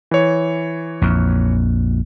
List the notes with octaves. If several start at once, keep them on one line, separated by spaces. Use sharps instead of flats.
E3 C#5
A#1 F2